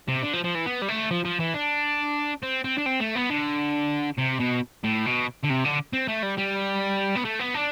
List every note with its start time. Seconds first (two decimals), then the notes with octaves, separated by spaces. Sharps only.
0.08 C3
0.23 D3
0.34 F3
0.44 F3
0.55 E3
0.66 B3
0.82 G3
0.89 A3
1.11 F3
1.25 F3
1.40 E3
1.54 D4
2.43 C4
2.64 C4
2.78 D4
2.86 C4
3.00 A3
3.16 B3
3.30 D3
4.18 C3
4.39 B2
4.84 A2
5.06 B2
5.43 D3
5.50 C3
5.64 D3
5.93 C4
6.08 A3
6.23 G3
6.37 G3
7.16 B3
7.25 A3
7.39 B3
7.54 D4